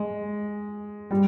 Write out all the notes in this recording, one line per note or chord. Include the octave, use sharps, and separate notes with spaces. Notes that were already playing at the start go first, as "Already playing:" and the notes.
Already playing: G#3
G3